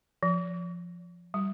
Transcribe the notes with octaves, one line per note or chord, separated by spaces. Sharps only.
F3
G3